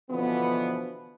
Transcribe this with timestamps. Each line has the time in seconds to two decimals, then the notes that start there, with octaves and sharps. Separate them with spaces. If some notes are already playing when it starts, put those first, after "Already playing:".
0.10 B2 D3 E3 F3 B3